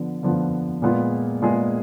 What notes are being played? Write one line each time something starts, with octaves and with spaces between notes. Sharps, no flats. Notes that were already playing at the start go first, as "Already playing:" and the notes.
Already playing: D3 F3 B3
D3 F3 B3 F4
A#2 G#3 B3 F4 G#4
A#2 G#3 B3 F4 G#4